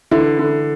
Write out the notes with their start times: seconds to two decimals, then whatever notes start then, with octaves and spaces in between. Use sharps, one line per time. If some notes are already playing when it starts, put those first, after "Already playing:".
0.11 D3 E4
0.39 D3